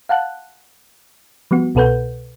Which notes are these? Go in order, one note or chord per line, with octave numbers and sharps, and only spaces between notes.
F5 F#5 A5 F#6
F3 G3 B3 F#4
C2 B2 A4 B4 F#5 G6